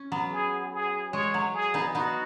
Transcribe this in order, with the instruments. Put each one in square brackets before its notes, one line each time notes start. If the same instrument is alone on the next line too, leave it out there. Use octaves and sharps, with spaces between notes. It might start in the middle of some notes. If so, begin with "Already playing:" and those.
Already playing: [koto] C#4
F#3 B3
[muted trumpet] G#4
G#4
[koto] G#3 [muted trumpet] C#5
[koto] F#3
[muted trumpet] G#4
[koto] B3 D#4
[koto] B3 D#4 [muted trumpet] F#4